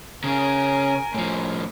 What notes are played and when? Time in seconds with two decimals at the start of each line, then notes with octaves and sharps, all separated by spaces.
0.24 C#3 C#4 A#4 G#5
1.14 A2 F3